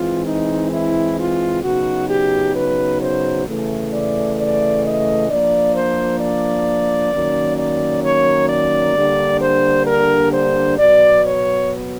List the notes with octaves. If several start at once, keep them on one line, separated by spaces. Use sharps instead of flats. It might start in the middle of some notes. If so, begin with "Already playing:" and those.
Already playing: E3 G#3 C4 F4
D#4
E4
F4
C#3 F#3 B3 D#4 F#4
G4
B4
C5
C#3 E3 A3
D5
D5
D#5
F3 A#3 D4 D5
C5
D5
D#3 F#3 A#3 C#4
D5
C#5
D5
D3 G3 A#3 D4
C5
A#4
C5
B2 F#3 B3 D5
C#5